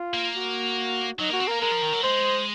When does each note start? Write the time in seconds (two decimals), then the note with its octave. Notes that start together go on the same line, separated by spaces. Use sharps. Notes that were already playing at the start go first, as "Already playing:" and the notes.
Already playing: F4
0.14 A#3
0.35 F#4
1.19 F#3 D#4
1.30 A#3 F#4
1.40 C4
1.48 A#3 A#4
1.61 G#3 A#4
1.72 F3
1.83 D#3
1.93 F#3
2.03 G#3 C5